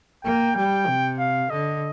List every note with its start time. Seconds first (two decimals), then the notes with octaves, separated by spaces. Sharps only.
0.24 A#3 G5
0.56 G3 G5
0.88 C3
1.19 F5
1.50 D3 D#5